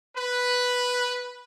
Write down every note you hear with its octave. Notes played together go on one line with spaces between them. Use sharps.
B4